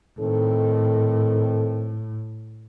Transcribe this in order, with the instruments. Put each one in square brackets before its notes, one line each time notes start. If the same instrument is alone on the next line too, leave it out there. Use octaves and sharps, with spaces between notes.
[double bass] A2 [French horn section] D#3 C4 A4